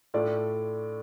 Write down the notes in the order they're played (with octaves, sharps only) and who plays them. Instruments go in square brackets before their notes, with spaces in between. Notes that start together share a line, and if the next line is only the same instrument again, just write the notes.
[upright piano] A2 A3 D4 F4 D5